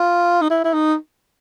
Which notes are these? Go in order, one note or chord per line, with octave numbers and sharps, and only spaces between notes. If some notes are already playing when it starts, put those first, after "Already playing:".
Already playing: F4
D#4
E4
E4
D#4